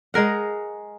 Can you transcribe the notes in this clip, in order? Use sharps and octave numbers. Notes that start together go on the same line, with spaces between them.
G#3 G#4 A#4 F#5